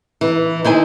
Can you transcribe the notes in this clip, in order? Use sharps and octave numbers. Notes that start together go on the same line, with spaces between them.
E3
D#3 E4 C5 G#5